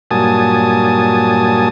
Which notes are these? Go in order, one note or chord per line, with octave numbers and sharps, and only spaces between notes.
G2 A#2 F#3 G#5 A5 D#6